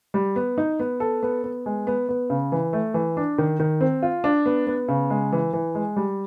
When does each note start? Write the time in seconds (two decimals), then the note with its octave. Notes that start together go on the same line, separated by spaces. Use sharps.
0.14 G3
0.36 B3
0.58 D#4
0.80 B3
1.00 A4
1.23 B3
1.44 B3
1.66 G#3
1.87 B3
2.09 B3
2.30 C#3
2.52 E3
2.73 A3
2.94 E3
3.17 D4
3.38 D#3
3.60 D#3
3.81 C4
4.02 F4
4.24 D4
4.46 B3
4.67 B3
4.88 C#3
5.10 G#3
5.32 E3
5.53 E3
5.75 G#3
5.96 G3